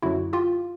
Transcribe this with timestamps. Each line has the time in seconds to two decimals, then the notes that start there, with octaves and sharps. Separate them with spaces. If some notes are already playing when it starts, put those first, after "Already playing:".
0.02 F#2 D3 F#3 E4 F#4
0.33 F4 G4